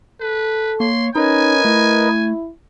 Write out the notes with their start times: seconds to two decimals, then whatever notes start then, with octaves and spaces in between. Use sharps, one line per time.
0.21 A4 B4
0.80 A#3 C#5 C6
1.15 C#4 D#4 A#4 B4 D#5 G#5
1.65 A3 E4